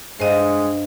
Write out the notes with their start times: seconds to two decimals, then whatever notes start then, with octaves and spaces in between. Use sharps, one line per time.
0.20 G2 G#3 C5 D#5 F5